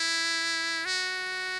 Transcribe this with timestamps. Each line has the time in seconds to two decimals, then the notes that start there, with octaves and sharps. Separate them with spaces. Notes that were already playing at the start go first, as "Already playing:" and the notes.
Already playing: E4
0.85 F#4